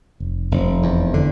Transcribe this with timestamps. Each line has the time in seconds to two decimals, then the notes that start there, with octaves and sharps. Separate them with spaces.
0.20 F1
0.51 F1
0.83 E2
1.14 D3